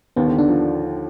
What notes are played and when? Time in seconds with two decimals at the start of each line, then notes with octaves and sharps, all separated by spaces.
0.16 D#2 D#3 B3
0.27 D3
0.38 D3 D4
0.49 F3